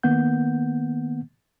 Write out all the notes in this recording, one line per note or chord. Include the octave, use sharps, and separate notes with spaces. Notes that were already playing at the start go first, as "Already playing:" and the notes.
D#3 A#3 B3 F#5 G6